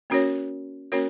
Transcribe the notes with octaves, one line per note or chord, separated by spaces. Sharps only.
A#3 C#4 F#4 A#4 C#5
A#3 C#4 F#4 A#4 C#5